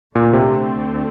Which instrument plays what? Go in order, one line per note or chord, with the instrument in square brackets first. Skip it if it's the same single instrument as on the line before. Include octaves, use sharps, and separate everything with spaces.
[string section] D2 D3 A3 C4 [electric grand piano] A#2
[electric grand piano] C3